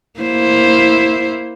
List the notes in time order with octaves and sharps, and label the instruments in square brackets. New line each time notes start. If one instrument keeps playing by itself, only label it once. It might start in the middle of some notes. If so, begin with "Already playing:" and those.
[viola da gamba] A#3 E4 C5